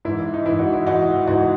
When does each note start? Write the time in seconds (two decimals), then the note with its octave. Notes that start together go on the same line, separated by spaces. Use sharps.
0.05 G#2 E3 E4
0.34 D#4
0.45 G#2 E3 E4
0.59 D#4 F#4
0.73 E4
0.86 G#2 E3 D#4 F#4
1.27 G#2 E3 D#4 F#4